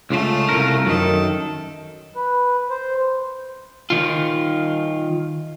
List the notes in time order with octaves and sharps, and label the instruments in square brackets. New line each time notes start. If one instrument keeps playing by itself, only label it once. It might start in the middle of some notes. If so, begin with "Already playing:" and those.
[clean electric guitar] C#2 C#3 [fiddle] A3 F4
[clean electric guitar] C2 A#4
[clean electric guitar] F#2 D#3 [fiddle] A4
[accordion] B4
C5
[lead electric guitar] D#3 F4